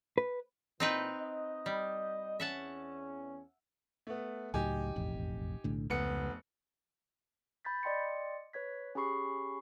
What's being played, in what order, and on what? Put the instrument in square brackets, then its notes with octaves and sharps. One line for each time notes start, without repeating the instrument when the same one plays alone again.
[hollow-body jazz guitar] B4
[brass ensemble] A#2 E3 [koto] C4 D#4 B4
[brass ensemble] D#5
[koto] G3
[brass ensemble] E2 C#4 [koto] E5 F#5 A5
[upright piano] A3 B3
[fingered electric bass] C#2 A2 F#3 [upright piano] D#4 G4 G#5
[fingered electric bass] E1 A1 F2
B1 A2 D3
[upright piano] F1 B3 C#7 [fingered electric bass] C#2
[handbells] B5 G6 A6 B6
D5 D#5 G5 C6 C#7
B4 C#5 G#6 B6
C#4 G4 G#4 B5 C#6 C7